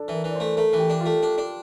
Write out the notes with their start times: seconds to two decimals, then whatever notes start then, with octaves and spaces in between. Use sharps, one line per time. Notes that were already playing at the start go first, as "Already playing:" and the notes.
Already playing: D4 A4
0.08 E3
0.14 A#4
0.24 E3
0.30 D5
0.35 C5
0.40 A3
0.57 A3 A#4
0.73 E3
0.78 G4
0.90 D4
1.00 F4
1.05 A3
1.23 D4
1.38 D4